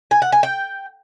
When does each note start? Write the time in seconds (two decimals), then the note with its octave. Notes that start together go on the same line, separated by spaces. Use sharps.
0.11 G#5
0.22 F#5
0.32 G#5
0.43 G5